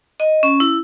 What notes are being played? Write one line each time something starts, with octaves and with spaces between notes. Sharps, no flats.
D#5
C#4
E4